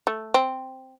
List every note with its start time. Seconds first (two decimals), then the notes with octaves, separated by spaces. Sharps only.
0.07 A3
0.34 C4